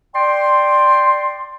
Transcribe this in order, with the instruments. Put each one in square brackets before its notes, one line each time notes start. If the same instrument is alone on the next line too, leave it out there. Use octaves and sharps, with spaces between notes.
[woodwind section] D5 G5 C6